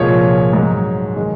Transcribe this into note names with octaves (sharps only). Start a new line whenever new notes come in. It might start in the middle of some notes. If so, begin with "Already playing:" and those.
Already playing: C2 A#2 F3 G#3 C#5
G#2 F#3
D#3 G#3